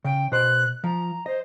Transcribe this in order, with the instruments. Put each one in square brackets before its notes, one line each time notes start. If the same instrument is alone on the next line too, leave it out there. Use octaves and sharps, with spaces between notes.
[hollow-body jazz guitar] C#3 [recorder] G5
[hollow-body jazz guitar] B2 C5 [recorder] F#6
[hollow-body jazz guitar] F3 [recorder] A#5
[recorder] C5 [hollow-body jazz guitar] D#5